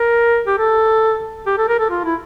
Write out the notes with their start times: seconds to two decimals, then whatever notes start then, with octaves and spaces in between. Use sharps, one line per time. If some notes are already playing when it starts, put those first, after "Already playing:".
Already playing: A#4
0.47 G4
0.58 A4
1.46 G4
1.58 A4
1.68 A#4
1.79 A4
1.90 F4
2.05 E4